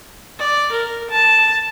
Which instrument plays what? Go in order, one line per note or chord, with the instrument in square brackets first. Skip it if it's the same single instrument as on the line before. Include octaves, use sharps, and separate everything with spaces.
[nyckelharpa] D5
A#4
A5